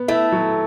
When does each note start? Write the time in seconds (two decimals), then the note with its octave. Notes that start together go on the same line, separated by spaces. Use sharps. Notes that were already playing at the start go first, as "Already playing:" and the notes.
Already playing: B3
0.08 A3 E4
0.32 F#3